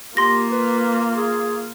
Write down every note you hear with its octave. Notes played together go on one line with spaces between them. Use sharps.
A#3 F4 G4 C6 A#6
B4
G#4